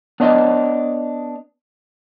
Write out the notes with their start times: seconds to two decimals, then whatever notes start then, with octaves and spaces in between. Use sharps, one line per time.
0.20 B3 D4 C#5 D#5